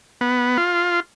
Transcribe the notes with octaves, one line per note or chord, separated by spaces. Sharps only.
B3
F4